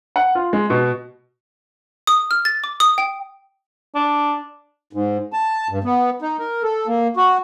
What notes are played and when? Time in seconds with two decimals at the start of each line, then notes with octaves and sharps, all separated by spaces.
0.16 F#5
0.35 F4
0.53 G#3
0.70 B2
2.07 D#6
2.31 F6
2.45 A6
2.64 D6
2.80 D#6
2.98 G5
3.95 D4
4.93 G#2
5.33 A5
5.69 G2
5.84 B3
6.22 D#4
6.39 A#4
6.63 A4
6.87 A#3
7.17 F#4